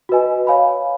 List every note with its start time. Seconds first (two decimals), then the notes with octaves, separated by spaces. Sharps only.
0.09 F#4 B4 D#5 G#5
0.47 C#5 F5 G#5 B5